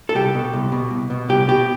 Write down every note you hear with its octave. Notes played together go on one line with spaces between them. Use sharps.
A4
C2 G4
B2
C2
B2
C2
B2
C2 G4
B2 G4